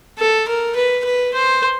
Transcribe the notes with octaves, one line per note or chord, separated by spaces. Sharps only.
A4
A#4
B4
B4
C5